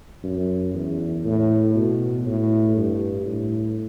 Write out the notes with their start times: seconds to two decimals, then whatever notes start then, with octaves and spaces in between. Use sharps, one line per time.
0.24 F#2
0.74 E2
1.24 A2
1.75 B2
2.26 A2
2.76 G2
3.26 A2